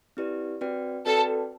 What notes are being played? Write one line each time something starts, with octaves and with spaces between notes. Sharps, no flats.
C4 E4 G4 B4 D5
C4 F#4 B4 D5 G5
C4 F#4 A4 B4 D5 G5